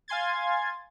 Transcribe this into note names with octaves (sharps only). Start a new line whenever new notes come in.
F5 G#5 C6 G#6 A6